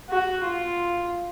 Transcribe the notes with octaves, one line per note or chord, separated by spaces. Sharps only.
F#4
F4